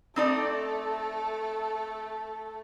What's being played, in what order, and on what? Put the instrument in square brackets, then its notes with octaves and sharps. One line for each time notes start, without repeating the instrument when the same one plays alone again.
[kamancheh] A3 A4 [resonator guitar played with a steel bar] C4 D#4 D5